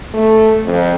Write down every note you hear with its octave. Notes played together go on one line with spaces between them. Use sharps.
A3
F2